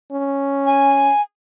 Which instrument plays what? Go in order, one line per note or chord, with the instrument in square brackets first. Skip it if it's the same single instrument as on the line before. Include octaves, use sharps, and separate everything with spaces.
[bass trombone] C#4
[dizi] G#5